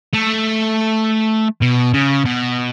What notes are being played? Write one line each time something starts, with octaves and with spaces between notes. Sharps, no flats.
A3
B2
C#3
B2